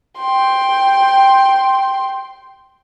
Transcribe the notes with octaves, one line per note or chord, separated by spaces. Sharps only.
G5 C6